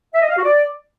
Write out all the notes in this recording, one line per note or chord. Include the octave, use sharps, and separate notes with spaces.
E5
D#5
F5
F#4
D5